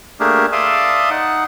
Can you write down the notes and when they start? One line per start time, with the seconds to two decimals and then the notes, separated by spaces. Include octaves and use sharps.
0.20 A3 A#3 D4 G4 G#4 A#4
0.53 D5 E5 F5 A5 C6 D#6
1.10 D#4 F#5